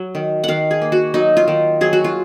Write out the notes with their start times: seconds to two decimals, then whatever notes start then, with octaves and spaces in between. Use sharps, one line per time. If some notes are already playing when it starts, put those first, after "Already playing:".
Already playing: F#3
0.15 D#3
0.44 D#3 F5 F#5
0.71 G#4
0.82 A#3
0.92 F#4
1.14 F#3 D#4
1.37 F4
1.48 D#3
1.81 F#3 G#4
1.93 F#4
2.04 F4